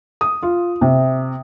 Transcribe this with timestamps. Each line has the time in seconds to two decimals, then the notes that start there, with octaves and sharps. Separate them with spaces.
0.21 D#6
0.43 F4
0.81 C3